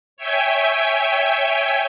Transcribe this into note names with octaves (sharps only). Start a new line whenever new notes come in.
C#5 E5 G5 G#5